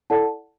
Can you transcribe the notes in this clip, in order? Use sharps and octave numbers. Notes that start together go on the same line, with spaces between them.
E4 A4 D5 F#5 A5